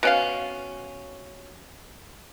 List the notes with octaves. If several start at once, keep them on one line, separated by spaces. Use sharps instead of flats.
B2 C#4 F5